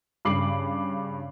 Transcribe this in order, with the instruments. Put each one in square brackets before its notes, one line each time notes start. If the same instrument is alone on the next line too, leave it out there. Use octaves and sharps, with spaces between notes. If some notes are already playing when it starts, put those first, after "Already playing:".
[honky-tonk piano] G2 C#3 D6 C7 F#7